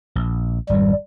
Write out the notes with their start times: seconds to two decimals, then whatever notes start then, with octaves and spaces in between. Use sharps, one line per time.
0.15 A#1
0.70 G#1 F2 G3